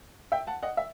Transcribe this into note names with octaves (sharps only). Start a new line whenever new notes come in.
E5 G5
F#5 A5
D#5 F#5
E5